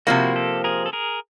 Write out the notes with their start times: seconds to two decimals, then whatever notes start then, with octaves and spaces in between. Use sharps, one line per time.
0.07 C3 F3 A#3 E4 F#4
0.36 G4 A4
0.64 G#4 A#4
0.86 A4
0.93 G#4 A#4